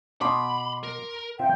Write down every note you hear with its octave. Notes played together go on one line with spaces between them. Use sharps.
B2 B5 C6 D6
A#4
C4 F4 E5 G5